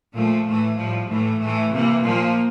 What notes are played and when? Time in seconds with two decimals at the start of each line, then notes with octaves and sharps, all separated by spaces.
0.14 A#2 F3 A3
0.46 A2 E3 A3
0.76 A2 F3 G3
1.08 A2 E3 A3
1.39 A2 E3 A3
1.70 C3 E3 A#3
2.02 A#2 F3 A#3